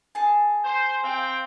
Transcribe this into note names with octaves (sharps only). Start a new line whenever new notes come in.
G#4 A5
C5
C4 F5 G5